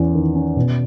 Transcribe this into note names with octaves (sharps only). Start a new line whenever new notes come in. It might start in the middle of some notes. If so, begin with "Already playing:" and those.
Already playing: E2 C#4
D#3
C#4
B2